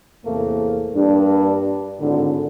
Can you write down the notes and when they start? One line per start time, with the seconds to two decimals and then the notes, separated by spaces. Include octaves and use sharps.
0.25 E2 A2 C3 A3 A#3
0.94 G2 A#3 D4
1.99 G#1 A2 D3